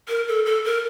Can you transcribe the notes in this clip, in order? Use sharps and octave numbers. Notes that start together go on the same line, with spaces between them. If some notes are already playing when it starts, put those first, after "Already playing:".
A#4
A4
A4
A#4